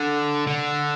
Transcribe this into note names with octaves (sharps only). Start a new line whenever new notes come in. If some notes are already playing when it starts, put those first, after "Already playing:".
Already playing: D3
D3